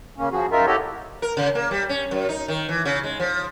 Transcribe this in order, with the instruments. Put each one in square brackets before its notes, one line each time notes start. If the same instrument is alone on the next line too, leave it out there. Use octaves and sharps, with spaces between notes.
[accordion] C#3 A#3 C#4
C#3 F3 F#4 G#4
F#2 D#4 F4 A#4 E5
E4 F#4 G4 A4 C#5 D#5
[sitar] A#4
C#3
A#3
G3
C#4
F#2
D#4
D#3
E3
C#3
G#3
F3